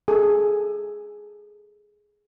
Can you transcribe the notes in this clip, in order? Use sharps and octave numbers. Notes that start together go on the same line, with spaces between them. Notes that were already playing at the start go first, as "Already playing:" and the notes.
G#4 A4